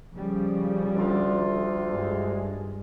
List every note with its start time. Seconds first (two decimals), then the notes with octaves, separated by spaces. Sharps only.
0.12 C#3 F3 G3
0.96 D2 F4
1.87 G2 G#3